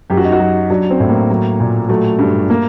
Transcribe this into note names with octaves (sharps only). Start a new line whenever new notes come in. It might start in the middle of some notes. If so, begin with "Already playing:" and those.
F#2 G4
F#4
D#4
F#4
F#3
F#3 D4
C4
A2
A#3
F#3
A#2
F#3 A3
G2
A#3